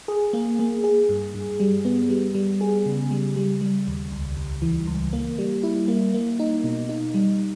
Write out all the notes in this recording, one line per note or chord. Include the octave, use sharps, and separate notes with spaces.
G#4
A#3
A#3
G#4
G2
G2
G3
B3
G3
G3
G#4
C#3
G3
G3
G3
D#2
C#2
C#2
E3
C#2
A#3
G3
E4
A#3
A#3
D#4
B2
D#4
G3